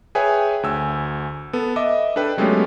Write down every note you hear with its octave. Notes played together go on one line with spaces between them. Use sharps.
G#4 B4 C#5 E5 G5 G#5
D2 G#5 E6
B3 A4
D#5 E5 D6
D4 A4 B4 G5
F#3 G#3 A3 B3 C#4 G4